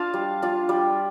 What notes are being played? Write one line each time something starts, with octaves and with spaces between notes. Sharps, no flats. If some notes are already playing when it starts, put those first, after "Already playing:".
Already playing: D4 F4 F5 A5
G3
D4 F4
G3